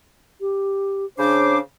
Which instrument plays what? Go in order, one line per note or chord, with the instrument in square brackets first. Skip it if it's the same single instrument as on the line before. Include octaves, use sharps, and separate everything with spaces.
[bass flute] G4
[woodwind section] C#3 C5 D6 [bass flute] D4